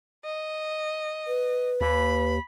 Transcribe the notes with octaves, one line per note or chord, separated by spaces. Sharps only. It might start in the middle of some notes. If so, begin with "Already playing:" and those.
D#5
B4
D#2 B5